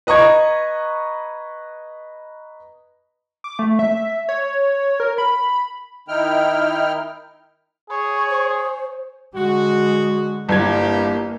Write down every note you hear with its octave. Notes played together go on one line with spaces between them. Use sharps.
B4 D#5 A#5 C#6 G#6
D6
A3
E5
C#5
A#4
B5
D#3 D#4 E4 G5 F6
G#4 C#5
C5
D3 G#3 F#4
G1 G2 A#3 E4 G4 G#6